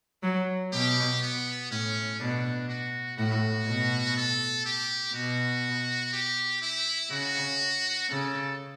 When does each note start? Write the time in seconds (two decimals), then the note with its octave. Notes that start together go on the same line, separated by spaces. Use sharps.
0.23 F#3
0.73 B2 G4
1.22 B3
1.71 A2 C#4
2.20 B2 D4
2.69 F#4
3.18 A2 F#4
3.67 B2
4.17 A4
4.65 G4
5.14 B2 F#4
6.13 G4
6.62 E4
7.10 C#3 F#4
8.09 C#3 A4